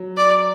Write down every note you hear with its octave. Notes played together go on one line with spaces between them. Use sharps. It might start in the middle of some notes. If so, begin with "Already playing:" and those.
Already playing: F#3
D5